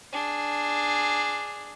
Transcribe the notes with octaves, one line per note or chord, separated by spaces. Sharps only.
D4 G#4